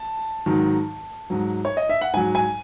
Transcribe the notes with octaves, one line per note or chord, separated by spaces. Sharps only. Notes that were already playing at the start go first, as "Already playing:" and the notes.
Already playing: A5
G#2 D#3 F#3
G#2 F#3
C#5
D#5
E5
F#5
G#2 F#3 G#5
G#5